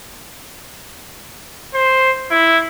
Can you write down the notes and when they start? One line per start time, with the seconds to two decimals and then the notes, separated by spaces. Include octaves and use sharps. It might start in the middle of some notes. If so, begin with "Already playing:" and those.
1.75 C5
2.31 E4